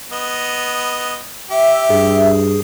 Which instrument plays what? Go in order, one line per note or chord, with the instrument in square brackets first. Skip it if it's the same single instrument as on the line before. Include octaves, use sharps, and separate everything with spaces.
[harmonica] B3 D#5
[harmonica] G4 [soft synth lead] E5
[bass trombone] G2 [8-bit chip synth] G#4